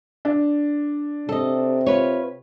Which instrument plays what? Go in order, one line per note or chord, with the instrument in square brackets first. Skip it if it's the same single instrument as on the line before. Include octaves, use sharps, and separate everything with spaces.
[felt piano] D4
[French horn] C3 [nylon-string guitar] A4 D#5
[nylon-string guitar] F4 B4 C#5